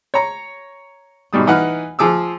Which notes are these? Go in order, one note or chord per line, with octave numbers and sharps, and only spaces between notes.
C#5 A#5
G#2 B2 G3 D#6
E3 D#4 B4 F#5 F6
F3 G#4 D6 E6